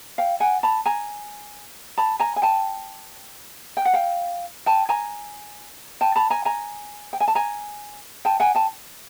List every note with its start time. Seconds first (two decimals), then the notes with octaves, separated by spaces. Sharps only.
0.18 F5 G5
0.40 F#5 G#5
0.63 A5 B5
0.86 G#5 A#5
1.98 A5 B5
2.20 G#5 A#5
2.36 G#5
2.42 G5 A5
3.77 G5
3.85 F#5
3.93 F5 G5
4.66 G5 A5
4.89 G#5 A#5
6.01 G5 A5
6.16 A5 B5
6.30 G#5 A#5
6.45 G#5 A#5
7.13 G5
7.20 G#5
7.28 A5
7.35 G#5 A#5
8.25 G5 A5
8.40 F#5 G#5
8.55 G5 A5